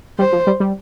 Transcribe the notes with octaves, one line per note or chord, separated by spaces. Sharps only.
G3 C5
F3
G3
G3